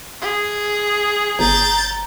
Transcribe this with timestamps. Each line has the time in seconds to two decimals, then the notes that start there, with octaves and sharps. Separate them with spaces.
0.22 G#4
1.39 G1 A#5 G6 A6